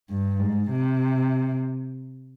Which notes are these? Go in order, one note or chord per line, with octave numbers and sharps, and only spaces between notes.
G2
G#2
C3